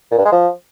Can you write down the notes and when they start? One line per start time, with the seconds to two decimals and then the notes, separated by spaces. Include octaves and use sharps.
0.11 A#2
0.18 G2
0.25 G#3
0.32 F3